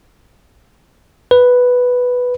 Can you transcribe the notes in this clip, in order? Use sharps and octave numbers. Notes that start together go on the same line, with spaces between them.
B4